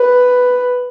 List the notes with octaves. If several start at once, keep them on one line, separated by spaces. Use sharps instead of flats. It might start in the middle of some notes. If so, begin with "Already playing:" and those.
Already playing: B4